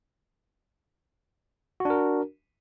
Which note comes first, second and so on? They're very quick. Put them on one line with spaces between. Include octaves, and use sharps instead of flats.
F#4 D4 A#4